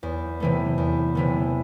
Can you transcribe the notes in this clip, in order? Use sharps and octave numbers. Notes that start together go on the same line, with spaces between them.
E2
C3 E3 A3
E2
C3 E3 A3